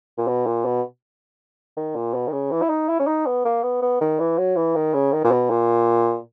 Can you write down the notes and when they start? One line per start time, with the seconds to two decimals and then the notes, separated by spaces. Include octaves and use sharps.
0.18 A#2
0.27 B2
0.47 A#2
0.65 B2
1.77 D#3
1.96 A#2
2.14 B2
2.27 D#3
2.32 C#3
2.51 E3
2.62 E4
2.70 D#4
2.89 E4
2.99 C#4
3.07 D#4
3.26 B3
3.45 A#3
3.63 B3
3.82 B3
4.01 D#3
4.20 E3
4.38 F#3
4.57 E3
4.75 D#3
4.94 C#3
5.13 D#3
5.25 A#2
5.31 B2
5.50 A#2